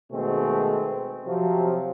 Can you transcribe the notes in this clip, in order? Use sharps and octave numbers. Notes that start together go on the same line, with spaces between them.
B2 D#3 G#3 A3 C4
C3 F3 F#3 C4